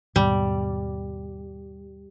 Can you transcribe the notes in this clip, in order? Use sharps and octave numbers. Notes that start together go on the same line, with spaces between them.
D#2 G#2 B2 G3